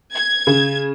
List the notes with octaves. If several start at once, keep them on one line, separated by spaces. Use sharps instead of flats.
G#6
C#3